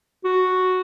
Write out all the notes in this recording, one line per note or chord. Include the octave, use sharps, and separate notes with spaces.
F#4